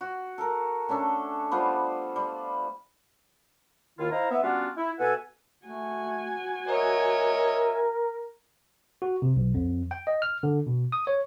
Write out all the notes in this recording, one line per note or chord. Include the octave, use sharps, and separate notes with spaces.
F#4
A4 A#4
A3 C#4 D4 A4
G3 B3 F4 C5
G3
D#2 D#3 E4 F4
D#4 E4 C5 F5 A#5
B3 E5
G3 B3 C#4 D4 F4 F#4
E4
B2 A4 B4 E5 F#5 G#5
A3 F#4 G#5
A#4 C#5 D#5 E5
F#4
C3
B1
F2
G5
D#5
F6
D3
B2
D#6
C#5